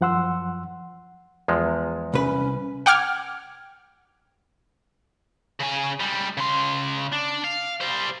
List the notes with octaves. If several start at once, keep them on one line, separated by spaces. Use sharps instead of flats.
F#2 F3 F#5 C6 E6
E2 F3 G#3
C2 C#4 B4
F#5 G5 D6 F6 G#6
C#3 G#5
G3 G#3
C#3 C6
D4
F5
G3 C5